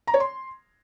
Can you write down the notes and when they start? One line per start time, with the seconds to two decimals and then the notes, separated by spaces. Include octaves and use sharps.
0.07 A#5
0.14 C#5
0.20 C6